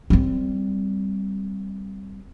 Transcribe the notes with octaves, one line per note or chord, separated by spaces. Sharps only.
G3 C4